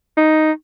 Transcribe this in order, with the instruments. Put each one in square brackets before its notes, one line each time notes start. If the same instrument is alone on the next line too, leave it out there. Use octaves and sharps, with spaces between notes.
[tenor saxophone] D#4